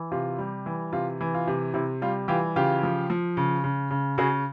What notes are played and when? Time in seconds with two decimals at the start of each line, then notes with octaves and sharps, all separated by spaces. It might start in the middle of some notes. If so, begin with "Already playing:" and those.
Already playing: E3
0.12 C3 F4
0.39 G3
0.66 E3
0.93 C3 F4
1.21 E3
1.34 F4
1.47 C3
1.74 C3 E4
2.02 G3 F4
2.28 E3 F4 G4
2.56 C#3 F4 G4
2.83 F3
3.10 F3
3.37 C#3
3.64 C#3
3.91 C#3
4.18 C#3 F#4 G#4